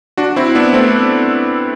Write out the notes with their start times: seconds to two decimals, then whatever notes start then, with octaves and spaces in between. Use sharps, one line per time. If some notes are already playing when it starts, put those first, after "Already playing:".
0.17 D4 F#4
0.36 C4 E4
0.55 B3 D4
0.73 A3 C4